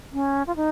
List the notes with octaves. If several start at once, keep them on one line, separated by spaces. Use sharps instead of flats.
C#4
F4
D#4